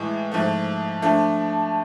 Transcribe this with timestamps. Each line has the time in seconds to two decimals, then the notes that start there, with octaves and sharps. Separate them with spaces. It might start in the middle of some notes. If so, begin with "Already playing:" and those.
Already playing: A2 E3 G#3
0.32 G#2 F3 A3
1.02 F3 A3 D4